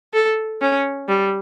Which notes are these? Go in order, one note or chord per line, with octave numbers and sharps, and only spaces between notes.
A4
C#4
G3